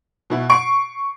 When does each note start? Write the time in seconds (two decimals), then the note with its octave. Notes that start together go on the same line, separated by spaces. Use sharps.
0.30 B2 E4
0.50 C#6 C7 D7